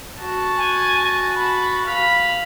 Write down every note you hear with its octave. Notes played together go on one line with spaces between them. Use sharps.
F#4 A5
G#5
B5
F5 B5 B6